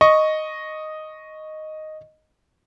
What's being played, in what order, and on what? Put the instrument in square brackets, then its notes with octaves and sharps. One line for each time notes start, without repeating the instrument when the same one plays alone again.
[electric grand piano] D#5 C#6